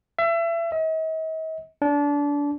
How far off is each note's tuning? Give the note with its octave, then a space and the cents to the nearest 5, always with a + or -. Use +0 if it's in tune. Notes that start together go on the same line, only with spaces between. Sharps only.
E5 +30
D#5 +45
D4 -25